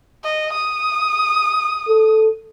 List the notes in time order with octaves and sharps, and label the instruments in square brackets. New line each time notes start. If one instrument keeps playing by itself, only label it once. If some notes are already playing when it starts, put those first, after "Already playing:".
[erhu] D#5
D#6
[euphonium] A4